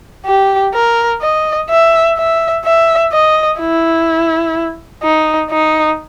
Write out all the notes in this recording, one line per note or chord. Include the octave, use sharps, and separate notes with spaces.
G4
A#4
D#5
E5
E5
E5
D#5
E4
D#4
D#4